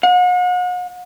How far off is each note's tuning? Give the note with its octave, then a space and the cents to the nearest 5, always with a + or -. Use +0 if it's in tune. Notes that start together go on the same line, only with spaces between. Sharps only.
F#5 -40